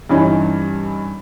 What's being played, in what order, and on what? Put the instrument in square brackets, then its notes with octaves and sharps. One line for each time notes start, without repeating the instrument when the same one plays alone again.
[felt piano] G2 E3 C#4 D#4